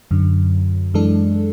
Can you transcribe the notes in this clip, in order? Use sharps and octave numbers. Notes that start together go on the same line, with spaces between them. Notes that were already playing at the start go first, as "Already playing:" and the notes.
F#2 D3 F#3
F#2 E3 G#3 D4 A4